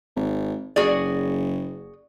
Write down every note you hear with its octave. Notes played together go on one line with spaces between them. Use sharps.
G#1
F#1 F#4 G#4 D5